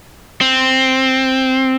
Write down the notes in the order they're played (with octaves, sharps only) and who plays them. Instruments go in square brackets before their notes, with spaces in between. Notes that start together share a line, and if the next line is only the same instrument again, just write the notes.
[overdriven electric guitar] C4